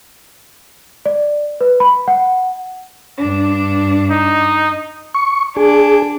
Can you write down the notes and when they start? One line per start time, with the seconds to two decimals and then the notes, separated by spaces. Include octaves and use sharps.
1.06 D5
1.61 B4
1.80 B5
2.08 F#5
3.18 G2 D4
4.11 D#4
5.14 C#6
5.57 D4 G#4